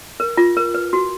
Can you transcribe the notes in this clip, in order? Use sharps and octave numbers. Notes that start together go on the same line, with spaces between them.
A#4
F4
A#4
B4
F#4